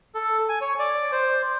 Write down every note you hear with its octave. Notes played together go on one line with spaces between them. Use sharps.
A4
G#5
C#5
D5
C5